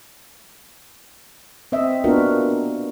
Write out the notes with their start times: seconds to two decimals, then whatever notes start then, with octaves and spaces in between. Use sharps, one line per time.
1.72 C4 D#5 E5
2.04 A#3 B3 D4 F4 F#4 A#4